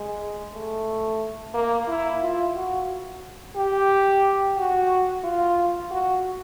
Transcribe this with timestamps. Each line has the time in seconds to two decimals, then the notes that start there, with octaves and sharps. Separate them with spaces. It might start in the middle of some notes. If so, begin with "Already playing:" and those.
Already playing: G#3
0.54 A3
1.54 A#3
1.88 E4
2.22 F4
2.55 F#4
3.56 G4
4.57 F#4
5.24 F4
5.91 F#4